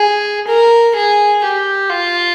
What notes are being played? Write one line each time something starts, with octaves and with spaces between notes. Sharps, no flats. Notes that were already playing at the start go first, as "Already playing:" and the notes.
Already playing: G#4
A#4
G#4
G4
F4